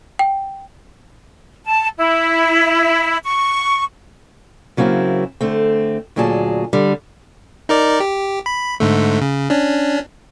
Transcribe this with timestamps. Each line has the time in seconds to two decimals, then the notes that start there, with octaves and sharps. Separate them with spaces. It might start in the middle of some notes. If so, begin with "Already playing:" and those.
0.19 G5
1.65 A5
1.97 E4
3.24 C#6
4.77 C#3 F#3 A#3 C4 E4
5.41 D3 A3 C4
6.16 D2 A#2 F#3 G#4 A5
6.73 D3 G3
7.69 D#4 A#4 D5
8.00 G4
8.46 B5
8.80 G#2 D3 A3
9.22 C#3
9.50 C#4 D4